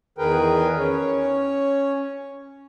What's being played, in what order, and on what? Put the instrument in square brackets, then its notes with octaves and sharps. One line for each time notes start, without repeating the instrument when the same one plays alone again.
[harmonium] E2 D#3 G#4 A#4 B4 G5
C#4 C#5